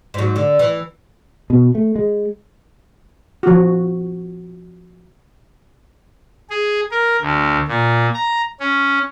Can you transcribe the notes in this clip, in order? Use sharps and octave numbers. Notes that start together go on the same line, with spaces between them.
G#2 F#3
D3
E3
B2
A3
G#3
F3 F#4
G#4
A#4
D2
A#2
A#5
C#4